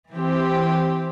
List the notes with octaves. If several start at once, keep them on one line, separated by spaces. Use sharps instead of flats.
E3 C4 G4